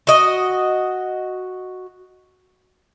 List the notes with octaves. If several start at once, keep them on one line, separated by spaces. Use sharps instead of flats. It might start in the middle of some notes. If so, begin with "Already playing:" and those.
F#4 D#5